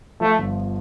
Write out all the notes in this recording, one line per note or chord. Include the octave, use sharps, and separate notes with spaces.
F3 A3
G1